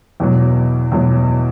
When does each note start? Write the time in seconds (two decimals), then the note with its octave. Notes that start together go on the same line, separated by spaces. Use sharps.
0.20 E2 B2 F#3
0.92 E2 B2 F#3